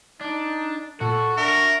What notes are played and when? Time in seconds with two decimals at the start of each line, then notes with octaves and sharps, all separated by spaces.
0.21 D4 D#4
1.01 A#2 F#4 A4
1.37 D4 A#4 E5